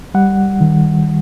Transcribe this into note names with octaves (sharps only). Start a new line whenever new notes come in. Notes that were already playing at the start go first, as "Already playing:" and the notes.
G3 F#5
D#3